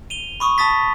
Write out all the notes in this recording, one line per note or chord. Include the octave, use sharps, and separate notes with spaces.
D#7 F7 G7
B5 C#6 D#6
A5 D#6 A6 B6